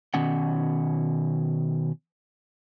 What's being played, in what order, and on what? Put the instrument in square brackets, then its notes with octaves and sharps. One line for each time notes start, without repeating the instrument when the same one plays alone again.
[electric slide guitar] B2 D#3 C#4 F#5